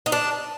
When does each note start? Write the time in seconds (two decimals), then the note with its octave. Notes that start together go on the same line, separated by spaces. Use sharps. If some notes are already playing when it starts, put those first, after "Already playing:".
0.06 D#4
0.12 D4